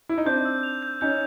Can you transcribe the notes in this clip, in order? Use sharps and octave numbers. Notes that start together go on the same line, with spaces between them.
E4
D#4
C4 D4 G6
E6
F7
G6
C#4 D#4 G6